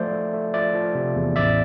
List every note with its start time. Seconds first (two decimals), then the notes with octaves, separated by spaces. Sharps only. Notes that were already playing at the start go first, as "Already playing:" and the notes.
Already playing: F3 A3 C5 D5
0.13 A3
0.33 A3
0.54 F3 D5 E5
0.74 F3
0.95 C3
1.16 E2
1.36 A1 D5 E5